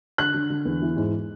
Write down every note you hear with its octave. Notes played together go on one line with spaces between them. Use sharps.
D3 F#6
D3
D3
E2
E3
G#2